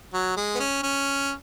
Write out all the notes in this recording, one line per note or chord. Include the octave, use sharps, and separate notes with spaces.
F#3
G#3
B3
C#4
C#4